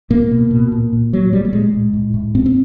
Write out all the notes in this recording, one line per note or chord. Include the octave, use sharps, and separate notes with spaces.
A2 A#3
B2
B2
A#2
A#2
A2 F#3
A2 G3
A3
A#2 G#3
A#2
A2
A2
A2 C4
C4